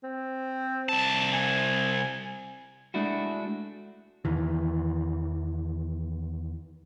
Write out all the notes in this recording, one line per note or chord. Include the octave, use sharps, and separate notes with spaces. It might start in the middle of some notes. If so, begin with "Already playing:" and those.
C4
C2 A5
G#5
G#3 A3 D4 E4 F#4
E2 D#3 E3